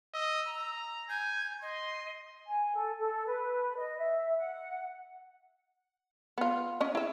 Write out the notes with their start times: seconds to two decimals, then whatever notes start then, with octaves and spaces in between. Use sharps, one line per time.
0.14 D#5 E6
0.48 A#5
1.10 G#5 G6
1.62 D#5 C6
2.47 G#5
2.75 A4
2.98 A4
3.26 B4
3.77 D#5
3.98 E5
4.38 F#5
6.38 B3 F4
6.81 C#4 D#5
6.95 E4 E5